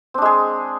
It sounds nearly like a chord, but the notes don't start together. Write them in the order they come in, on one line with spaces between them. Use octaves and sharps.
C4 D4 G#3 G#4